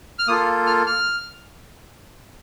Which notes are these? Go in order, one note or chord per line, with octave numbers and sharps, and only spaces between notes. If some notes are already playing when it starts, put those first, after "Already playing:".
F6
A#3 F4 A4 D#6
F6
F6